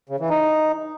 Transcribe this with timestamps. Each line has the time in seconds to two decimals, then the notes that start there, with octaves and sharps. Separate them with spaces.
0.09 C#3
0.20 E3
0.30 D#4